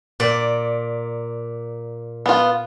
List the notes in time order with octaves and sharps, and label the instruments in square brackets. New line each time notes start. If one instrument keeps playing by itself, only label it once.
[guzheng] A#2 D5
[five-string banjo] B3 F4